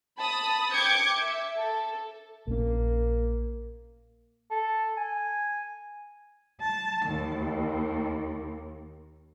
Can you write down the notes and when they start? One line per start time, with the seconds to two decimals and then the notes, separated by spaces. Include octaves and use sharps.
0.18 A5 B5 D#6
0.72 G5 D6 G6 G#6 C#7
1.17 E5
1.58 A4
2.47 A#1 A#3 C#4
4.51 A4
4.97 G#5
6.62 A5
7.07 D#2